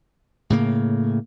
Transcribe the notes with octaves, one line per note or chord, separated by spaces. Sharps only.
A2 C#3 A#3